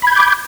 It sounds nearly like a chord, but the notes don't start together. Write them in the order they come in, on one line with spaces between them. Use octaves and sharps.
B5 G#6 G6 D6